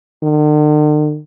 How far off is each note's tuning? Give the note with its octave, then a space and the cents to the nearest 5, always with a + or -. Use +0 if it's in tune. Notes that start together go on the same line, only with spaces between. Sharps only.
D3 +45